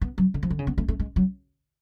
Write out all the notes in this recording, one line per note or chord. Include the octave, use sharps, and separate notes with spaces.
B3
F#3
D3
F3
D3
C#3
B3
A3
A3
G#3
F#3